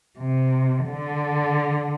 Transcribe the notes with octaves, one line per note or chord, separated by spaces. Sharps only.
C3
D3